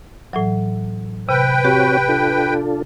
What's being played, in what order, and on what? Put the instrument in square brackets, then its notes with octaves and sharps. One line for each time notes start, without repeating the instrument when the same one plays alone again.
[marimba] A2 E3 F#3
[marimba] C3 [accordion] B4 G5
[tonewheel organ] C4 F#4 C#5 [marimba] G4
[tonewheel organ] D4 F4 A4